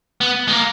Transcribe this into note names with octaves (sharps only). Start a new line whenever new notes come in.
B3
G#3
A#3